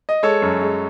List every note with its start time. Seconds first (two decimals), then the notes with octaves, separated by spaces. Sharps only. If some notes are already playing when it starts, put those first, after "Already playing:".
0.09 D#5
0.23 G#3 A4 C#5
0.42 F#2
0.61 G#3